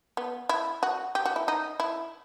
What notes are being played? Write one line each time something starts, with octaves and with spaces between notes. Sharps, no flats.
B3
E4
F#4
G4
F#4
E4
D#4
E4